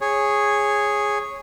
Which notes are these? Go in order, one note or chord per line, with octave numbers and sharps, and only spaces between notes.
G#4 C#5